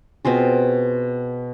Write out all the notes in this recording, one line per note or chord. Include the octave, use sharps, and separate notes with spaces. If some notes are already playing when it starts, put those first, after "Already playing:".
B2 C4 F4 G#4